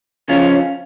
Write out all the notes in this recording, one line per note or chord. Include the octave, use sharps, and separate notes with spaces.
C#3 F3 C#4 F4